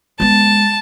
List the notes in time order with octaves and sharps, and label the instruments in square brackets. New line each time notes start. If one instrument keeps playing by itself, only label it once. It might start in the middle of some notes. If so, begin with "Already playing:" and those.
[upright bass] G#3 B3 [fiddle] A5